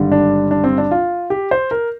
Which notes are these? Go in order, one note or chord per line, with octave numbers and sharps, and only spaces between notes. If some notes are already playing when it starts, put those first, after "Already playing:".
Already playing: G#1 G2 D3 G3
D4
D4
C4
D4
F4
G4
C5
A#4